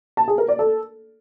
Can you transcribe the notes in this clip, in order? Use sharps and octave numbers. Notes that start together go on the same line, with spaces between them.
A5
G#4
A#4
D5
A4